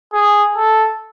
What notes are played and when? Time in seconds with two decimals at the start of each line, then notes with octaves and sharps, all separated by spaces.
0.13 G#4
0.56 A4